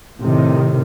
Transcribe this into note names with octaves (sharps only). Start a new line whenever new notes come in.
A2 C3 D#3